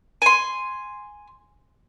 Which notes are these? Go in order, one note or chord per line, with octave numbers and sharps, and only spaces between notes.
G#5 C6